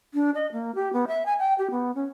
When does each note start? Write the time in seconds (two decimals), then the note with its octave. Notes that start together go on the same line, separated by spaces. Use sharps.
0.14 D4
0.35 D#5
0.52 A#3
0.75 G4
0.93 B3
1.08 E5
1.26 G#5
1.39 G5
1.58 G4
1.71 B3
1.95 C#4